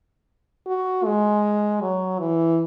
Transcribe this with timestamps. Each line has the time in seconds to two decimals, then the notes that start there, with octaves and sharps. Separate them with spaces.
0.67 F#4
1.05 G#3
1.81 F#3
2.19 E3